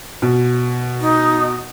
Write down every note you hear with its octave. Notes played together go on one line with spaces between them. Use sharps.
B2
D#4